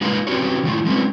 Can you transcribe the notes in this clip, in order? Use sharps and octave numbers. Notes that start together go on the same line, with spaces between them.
G#3 A#3 D#4 F4 B4 F5
C4 C#4 F#4 G4 B4 C#5
D#3 F3 A3 E4 F4
F#3 G#3 A3 C4 C#4 B4